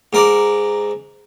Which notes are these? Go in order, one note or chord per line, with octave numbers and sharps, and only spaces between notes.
G#2 A#4 D5